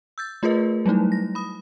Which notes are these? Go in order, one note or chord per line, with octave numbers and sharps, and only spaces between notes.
E6 G6 A6
A3 F4 G#4 A#4 B4 D#5
F#3 G3 A3 D#4 E4
A#6
B5 D#6